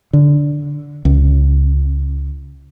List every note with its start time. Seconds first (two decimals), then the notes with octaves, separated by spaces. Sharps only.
0.13 D3
1.05 C#2